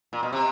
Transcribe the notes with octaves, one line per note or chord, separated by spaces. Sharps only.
A#2
B2
C3